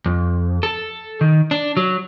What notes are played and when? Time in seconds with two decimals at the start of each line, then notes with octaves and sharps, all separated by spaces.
0.06 F2
0.63 A4
1.21 D#3
1.51 D4
1.77 F#3